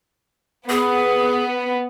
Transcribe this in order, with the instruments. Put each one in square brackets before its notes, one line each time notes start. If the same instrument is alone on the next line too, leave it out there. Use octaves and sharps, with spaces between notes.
[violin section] B3 [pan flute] G#4